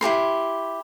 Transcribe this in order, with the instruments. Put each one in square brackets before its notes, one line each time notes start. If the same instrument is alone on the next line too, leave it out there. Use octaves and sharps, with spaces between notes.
[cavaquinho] E4 G4 A#4 C6